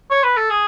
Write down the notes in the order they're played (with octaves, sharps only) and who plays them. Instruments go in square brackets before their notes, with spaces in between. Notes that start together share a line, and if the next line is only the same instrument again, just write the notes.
[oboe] C#5
B4
A4
G#4